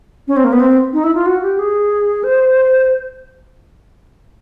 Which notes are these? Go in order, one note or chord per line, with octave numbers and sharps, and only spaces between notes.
C#4
C4
A#3
B3
C4
D#4
E4
F4
F#4
G4
G#4
C5